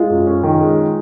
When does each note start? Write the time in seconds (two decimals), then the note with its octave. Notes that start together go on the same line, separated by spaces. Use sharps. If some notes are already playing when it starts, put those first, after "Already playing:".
Already playing: G#3 F4
0.10 F#2
0.27 C#4
0.43 D#3
0.60 G#3